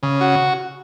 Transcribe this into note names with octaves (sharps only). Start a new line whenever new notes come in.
C#3
F#4